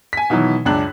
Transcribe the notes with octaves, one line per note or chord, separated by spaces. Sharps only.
G#5 B6
B2 D#3 E3 F#3
C#2 F#2 D4 F#6 F#7